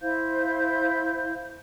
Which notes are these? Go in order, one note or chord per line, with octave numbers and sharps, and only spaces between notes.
E4 C5 F5 G6